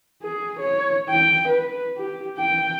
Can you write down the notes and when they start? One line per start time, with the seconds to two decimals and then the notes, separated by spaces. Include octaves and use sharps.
0.23 G#4
0.60 C#5
1.09 G5
1.48 B4
1.98 G4
2.38 G5